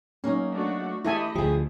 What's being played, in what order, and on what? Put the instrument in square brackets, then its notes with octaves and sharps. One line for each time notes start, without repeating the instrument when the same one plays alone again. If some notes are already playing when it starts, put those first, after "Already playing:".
[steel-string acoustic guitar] F#3 A#3 D#4 [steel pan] C#4
[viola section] A3 D4 F#4
[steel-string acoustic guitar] E3 A3 [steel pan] E4 A4 G#5 [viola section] G4 D#5 B5
[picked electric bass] D2 F3 [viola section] A3 [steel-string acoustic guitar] G4 G#4